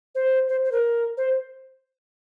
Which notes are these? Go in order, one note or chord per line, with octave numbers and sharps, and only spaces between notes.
C5
C5
C5
A#4
C5